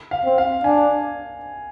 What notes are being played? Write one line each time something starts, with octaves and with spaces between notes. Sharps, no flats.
F5
C4
F5
D4 G#5